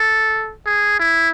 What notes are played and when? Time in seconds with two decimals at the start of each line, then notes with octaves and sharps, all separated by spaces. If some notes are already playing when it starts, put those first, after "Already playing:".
Already playing: A4
0.66 G#4
0.99 E4